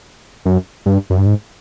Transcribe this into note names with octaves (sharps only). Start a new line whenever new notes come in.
F#2
G2
F#2
G2
G#2